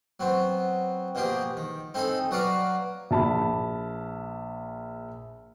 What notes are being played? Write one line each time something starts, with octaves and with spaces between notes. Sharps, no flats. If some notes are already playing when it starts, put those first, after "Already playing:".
F#3 B3 C4
B2 F3 A#3 G4 G#4
D#3
C4 D#4 A4 G#5 B5
F#3 F#4 B4 D5 F5 A#5
A#1 A5 B5